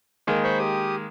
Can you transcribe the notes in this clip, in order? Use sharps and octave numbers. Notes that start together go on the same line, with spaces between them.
D#3 G#3 A#3
C5 B5 C#6
G4 D#6